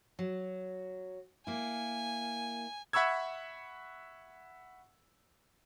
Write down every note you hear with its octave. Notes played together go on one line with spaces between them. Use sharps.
F#3
A#3 E4 G#5
E5 F#5 B5 C#6 E6 G#6